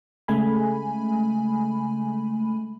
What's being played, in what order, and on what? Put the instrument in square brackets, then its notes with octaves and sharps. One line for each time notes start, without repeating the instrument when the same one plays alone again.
[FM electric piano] C#3 G#3 A3 G#5 B5